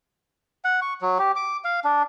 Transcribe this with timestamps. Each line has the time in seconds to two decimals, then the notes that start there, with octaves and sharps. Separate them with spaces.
0.65 F#5
0.82 C#6
1.01 F#3
1.19 G4
1.36 D6
1.64 F5
1.84 D4